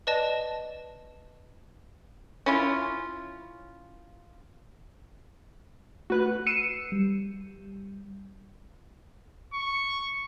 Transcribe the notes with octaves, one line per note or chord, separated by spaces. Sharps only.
B4 D5 D#5 A5
C#4 E4 F4
A3 F#4 B4 F#6
E6 C7 C#7 D#7 E7
G3
C#6